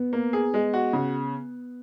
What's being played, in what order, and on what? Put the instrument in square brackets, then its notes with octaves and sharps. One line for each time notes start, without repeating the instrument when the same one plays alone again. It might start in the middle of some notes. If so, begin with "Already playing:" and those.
Already playing: [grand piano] B3
[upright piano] A#3
G#4
G#3
F#4
C#3